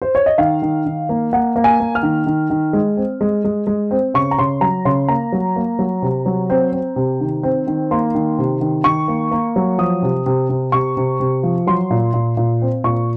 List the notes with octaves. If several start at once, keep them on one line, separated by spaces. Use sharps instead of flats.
C5
C#5
D#5
D#3 F5
D#3
D#3
A#3
A#3 F#5
A#3
G#5
A#3
F6
D#3
D#3
D#3
G#3
C4
G#3
G#3
G#3
C4
C#3 C#6
A#5
C#3 C6
F#3 A#5
C#3 C6
A#3 A#5
F#3
A#3
F#3
C3
F#3
C4
C4
C3
D#3
C4
D#3
A#3 C6
D#3
C3
D#3
D#3 C#6
A#3
A#3
F#3
F3 D#6
C3
C3
C3
C3 C#6
C3
C3
F3
F#3 C6
A#2
A#2
A#2
C4
A#2 C#6